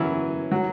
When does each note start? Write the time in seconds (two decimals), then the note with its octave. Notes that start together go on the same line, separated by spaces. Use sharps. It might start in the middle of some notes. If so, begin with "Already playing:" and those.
Already playing: E3 F#3 C#4
0.52 F#3